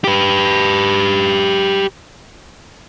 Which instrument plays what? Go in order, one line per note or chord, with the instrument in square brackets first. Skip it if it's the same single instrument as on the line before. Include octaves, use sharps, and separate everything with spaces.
[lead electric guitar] G4 B4